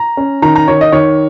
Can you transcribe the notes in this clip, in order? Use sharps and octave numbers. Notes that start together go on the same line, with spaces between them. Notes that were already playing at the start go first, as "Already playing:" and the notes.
Already playing: A#5
C#4
D#3 A#5
A#5
D#3 C#5
D#5
D#3 C#5